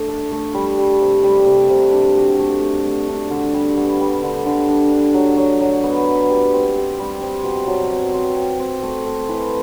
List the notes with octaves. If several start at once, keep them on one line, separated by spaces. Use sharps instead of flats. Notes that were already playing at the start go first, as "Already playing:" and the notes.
Already playing: A3 D4
A4
A3
G3
G3
C3
G3
C3
C3
D4
F#4
A3
A3
A3
D4
D3
G3
B3
G3
D3
D3
D4
D4
F#3
F#3
F#3
B3
B4
G4
C4
G4
G3
C4
B2
F#3
C4
C4
C4
C4
A3
A3
E3